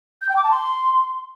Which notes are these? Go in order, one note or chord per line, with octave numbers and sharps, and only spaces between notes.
G6
G5
D6
A5
C6